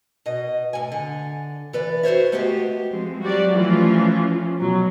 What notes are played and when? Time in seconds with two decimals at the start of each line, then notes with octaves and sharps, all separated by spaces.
0.26 B2 D#5
0.73 A2 G#5
0.92 D3
1.73 E3 B4 D5
2.03 E4 F#4 C5 C#5 E5
2.32 G#3 A3 B3 C4 F#4 G4
2.90 F3 G#3 C4
3.22 F#3 G3 F#4 G4 D5
3.52 E3 F3 A3 C#4 F4
4.60 B2 F#3